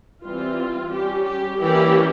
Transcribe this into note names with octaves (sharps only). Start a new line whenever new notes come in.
E3 G3 C4 F4
G3 C#4 G4
G4
E3 G3 A#3 C#4 G4